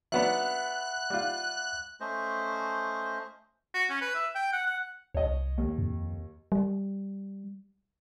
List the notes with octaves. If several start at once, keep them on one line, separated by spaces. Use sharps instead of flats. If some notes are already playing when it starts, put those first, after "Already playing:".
F#3 B3 D4 E5 F#5 B5 F#6
G3 F4
A3 C#4 C5 D#5
F#4
C#4
B4
E5
G5
F#5
F#5
C2 C#5 D#5
D#2
F2
G3